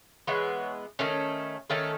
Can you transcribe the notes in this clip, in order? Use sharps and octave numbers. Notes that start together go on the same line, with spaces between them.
E3 G#3 B3 C#5
D#3 A3 C#4
D#3 A3 C#4 A4